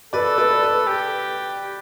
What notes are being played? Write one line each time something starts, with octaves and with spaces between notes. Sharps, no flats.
A4 B4 D5
B4 D5
B4
G4